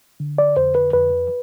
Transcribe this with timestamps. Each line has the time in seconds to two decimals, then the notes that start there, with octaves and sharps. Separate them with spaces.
0.20 D3
0.38 D5
0.57 F2 C5
0.75 B4
0.93 F2 B4